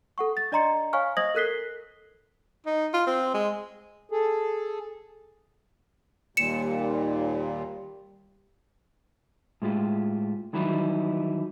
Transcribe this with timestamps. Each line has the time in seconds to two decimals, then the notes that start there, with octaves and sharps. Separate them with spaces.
0.18 A4 F#5 C#6
0.37 A6
0.52 D4 D5 D#5 A#5 C6 C#7
0.93 C#5 F5 G#5 C#6 F6
1.17 C5 D#5 D#6 G#6 A#6 F#7
1.35 A4 A#4 F#6 B6 C7 G7
2.67 D#4
2.94 F4
3.07 C4
3.34 G#3
4.12 G#4 A4
6.37 D#2 A#2 G3 C#7 E7
9.62 A2 G#3 F4 G4
10.53 D#3 E3 F#3 G3 D#4 E4